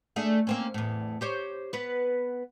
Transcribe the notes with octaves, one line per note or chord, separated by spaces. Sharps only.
A3 D4 G#4
A#3 C4 C#4
E2 A2
G4 C5 C#5
B3 B4